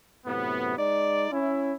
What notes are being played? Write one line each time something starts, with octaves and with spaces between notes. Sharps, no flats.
F#2 A2 C3 B3
G#3 D#4 D5
C#4 E4